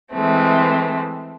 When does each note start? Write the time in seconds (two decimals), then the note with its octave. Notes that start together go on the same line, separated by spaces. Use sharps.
0.13 E3 G#3 A3 C4